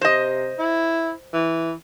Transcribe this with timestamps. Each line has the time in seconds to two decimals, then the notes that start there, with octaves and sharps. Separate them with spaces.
0.01 C3 C5 D#5
0.59 E4
1.33 E3